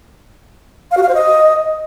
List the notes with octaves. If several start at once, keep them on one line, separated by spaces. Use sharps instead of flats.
F5
F#4
F5
C5
D#5